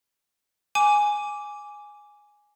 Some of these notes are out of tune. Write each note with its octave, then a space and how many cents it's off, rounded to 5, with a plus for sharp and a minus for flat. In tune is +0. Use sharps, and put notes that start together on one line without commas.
G#5 +0 D6 -10